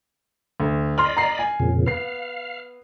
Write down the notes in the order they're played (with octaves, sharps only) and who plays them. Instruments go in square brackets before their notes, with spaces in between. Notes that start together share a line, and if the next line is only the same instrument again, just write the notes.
[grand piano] D2
[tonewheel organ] D5 D#5 B5 [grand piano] C6 F6
[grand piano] A#5 C7
G#5
[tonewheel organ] F2 A#2 C#3
[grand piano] B3 C7 [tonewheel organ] F5